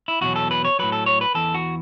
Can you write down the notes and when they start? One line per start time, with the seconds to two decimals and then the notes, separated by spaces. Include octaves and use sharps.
0.08 E4
0.21 E2 B2 F#3 F#4
0.36 A4
0.51 B4
0.65 C#5
0.79 A2 F#3 B4
0.92 A4
1.06 C#5
1.21 B4
1.35 E2 E3 A4
1.54 F#4